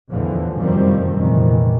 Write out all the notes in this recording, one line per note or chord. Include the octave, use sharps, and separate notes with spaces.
E2 A2 D3 E3 F3
F1 F#2 D#3 F3 G3 C4
F1 C#2 A#2 D#3 E3